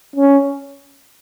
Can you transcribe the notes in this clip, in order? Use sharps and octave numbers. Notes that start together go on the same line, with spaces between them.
C#4